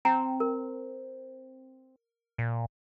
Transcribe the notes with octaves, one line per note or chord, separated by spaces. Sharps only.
C4 G5 A#5
A#4
A#2